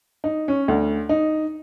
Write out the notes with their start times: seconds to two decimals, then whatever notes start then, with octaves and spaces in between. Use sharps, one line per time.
0.24 D#4
0.48 C#4
0.68 D2
1.09 D#4